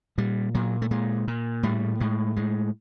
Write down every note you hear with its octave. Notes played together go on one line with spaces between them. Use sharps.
A#2 G3
A#2 F#3
A3
A#2 G#3
A#2
A2 G3
A2 G#3
A2 G#3